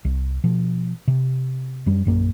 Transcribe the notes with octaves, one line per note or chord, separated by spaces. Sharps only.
C2
B2 F3
C3
F#2 G3
A#1 F#2 A#3